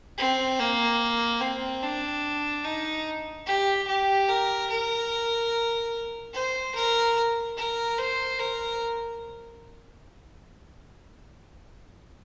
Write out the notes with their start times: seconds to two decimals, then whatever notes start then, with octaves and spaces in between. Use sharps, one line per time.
0.18 C4
0.59 A#3
1.41 C4
1.82 D4
2.64 D#4
3.46 G4
3.87 G4
4.29 A#4
4.70 A#4
6.33 C5
6.75 A#4
7.57 A#4
7.98 C5
8.39 A#4